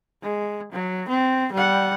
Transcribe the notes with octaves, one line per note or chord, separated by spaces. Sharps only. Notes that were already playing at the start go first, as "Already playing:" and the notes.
G#3
F#3
C4
G3 F#5